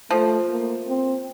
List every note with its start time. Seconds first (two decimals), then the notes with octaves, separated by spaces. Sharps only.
0.11 F3 A3
0.49 A#3
0.87 C4